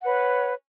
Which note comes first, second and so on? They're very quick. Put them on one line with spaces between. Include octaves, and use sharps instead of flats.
F#5 B4 C#5